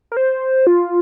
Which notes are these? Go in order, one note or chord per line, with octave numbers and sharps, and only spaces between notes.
A#4
C5
F4